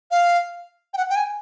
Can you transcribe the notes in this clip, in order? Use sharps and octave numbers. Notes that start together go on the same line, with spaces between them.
F5
G5
F#5
G5
G#5